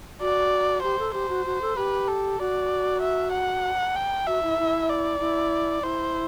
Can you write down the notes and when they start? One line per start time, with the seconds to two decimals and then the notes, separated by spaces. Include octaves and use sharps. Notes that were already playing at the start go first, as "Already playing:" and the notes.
0.20 F#4 D5
0.82 G4 C5
0.99 A4
1.14 G4 C5
1.29 F#4
1.46 F#4
1.62 A4
1.76 G4 B4
2.08 A4
2.39 F#4 D5
3.02 E5
3.32 F#5
3.95 G5
4.27 F#4 E5
4.43 E4
4.59 E4
4.89 D5
5.20 E4
5.83 E4 C5